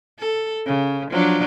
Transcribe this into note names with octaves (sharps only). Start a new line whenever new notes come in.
A4
C#3
F3 F#3 D4